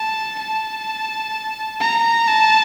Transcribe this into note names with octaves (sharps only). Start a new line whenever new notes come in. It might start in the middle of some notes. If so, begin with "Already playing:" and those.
Already playing: A5
A5
A#5
A5